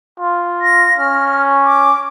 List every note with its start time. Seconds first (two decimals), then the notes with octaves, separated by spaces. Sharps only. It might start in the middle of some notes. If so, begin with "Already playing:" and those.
0.20 F4
0.61 A#6
0.98 C#4 F6
1.64 D6